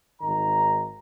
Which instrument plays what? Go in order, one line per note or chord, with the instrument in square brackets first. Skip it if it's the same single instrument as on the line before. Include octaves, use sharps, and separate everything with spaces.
[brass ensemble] G#1 D#3 A#5